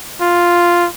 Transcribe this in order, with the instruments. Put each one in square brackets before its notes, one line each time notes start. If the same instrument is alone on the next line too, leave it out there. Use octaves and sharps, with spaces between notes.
[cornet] F4